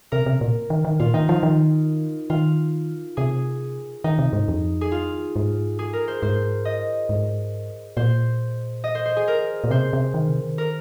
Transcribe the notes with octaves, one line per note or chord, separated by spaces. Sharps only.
C3 A#4
C3
A#2
D#3
D#3
A#2 F4
D#3 D#4
F3 F4
D#3
D#3 F4
C3 G#4
D#3 D#4
C3
G#2
F2
G#4
F4
G#2
G#4
A#4
C5
G#2 C5
D#5
G#2
A#2 C5
D#5
C5
C5
G#4
A#4
A#2
C3 C5
C3
D#3
C3
D#3
A#4